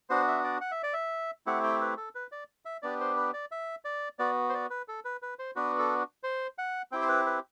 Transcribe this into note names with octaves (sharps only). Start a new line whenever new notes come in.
B3 D4 F#4 C5
E5
D5
F#5
E5
D5
E5
A3 C4 E4 G4 F#5
G5
B4
A4
B4
D5
E5
B3 D4 G4 D5
C5
B4
D5
E5
D5
B3 F#4 D5
C5
D5
B4
A4
B4
B4
C5
B3 D4 F#4 B4
A4
C5
F#5
C4 E4 G4 G5
C5
B4
B4